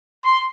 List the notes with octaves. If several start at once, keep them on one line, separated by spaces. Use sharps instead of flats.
C6